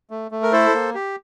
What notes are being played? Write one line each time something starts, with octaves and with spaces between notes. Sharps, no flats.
A3
A3
A#4
E4 A4 C5
A#3
G4